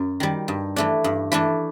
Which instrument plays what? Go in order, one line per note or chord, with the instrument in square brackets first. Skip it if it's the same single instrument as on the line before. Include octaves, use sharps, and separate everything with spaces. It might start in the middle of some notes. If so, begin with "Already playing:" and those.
Already playing: [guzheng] F#2
D#3 G3
G2
E3 A3 D4
G2
E3 A3 D4